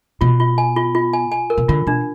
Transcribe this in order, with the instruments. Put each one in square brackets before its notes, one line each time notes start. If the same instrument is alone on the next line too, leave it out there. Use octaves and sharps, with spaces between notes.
[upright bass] B2 [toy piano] F4
[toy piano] F4
G#5
F4
F4
G#5
G#5
A#4
[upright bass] B2
[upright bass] D3 [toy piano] F4
[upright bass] B2 [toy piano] D4